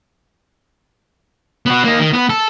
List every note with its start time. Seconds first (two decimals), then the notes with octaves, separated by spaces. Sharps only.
1.66 B3 F#4
1.84 A#3 D#4
1.99 D#3
2.13 B3
2.30 A4